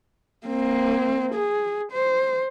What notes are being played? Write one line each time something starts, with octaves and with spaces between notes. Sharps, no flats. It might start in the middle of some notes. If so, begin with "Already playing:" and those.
A#3 C4
G#4
C5